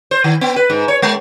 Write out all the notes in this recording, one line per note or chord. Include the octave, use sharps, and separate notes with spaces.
C5
D#3
B3
B4
G#2
C#5
G#3